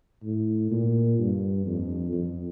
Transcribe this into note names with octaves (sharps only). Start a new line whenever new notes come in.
A2
A#2
G2
F2
F2